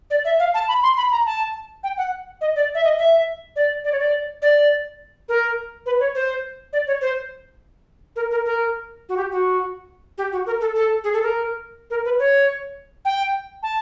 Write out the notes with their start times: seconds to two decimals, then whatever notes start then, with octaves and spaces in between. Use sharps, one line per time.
0.10 D5
0.25 E5
0.40 F5
0.54 A5
0.68 B5
0.83 C6
0.97 B5
1.12 A#5
1.26 A5
1.83 G5
1.98 F#5
2.41 D#5
2.55 D5
2.75 E5
2.84 D#5
2.99 E5
3.56 D5
3.84 D5
3.92 C#5
3.99 D5
4.42 D5
5.29 A#4
5.86 B4
6.00 C#5
6.15 C5
6.73 D5
6.87 C#5
7.01 C5
8.16 A#4
8.31 A#4
8.45 A#4
9.09 F#4
9.17 G4
9.31 F#4
10.18 G4
10.32 F#4
10.46 A#4
10.61 A4
10.75 A4
11.04 G#4
11.13 A4
11.23 A#4
11.90 A#4
12.05 B4
12.19 C#5
13.05 G5
13.63 A5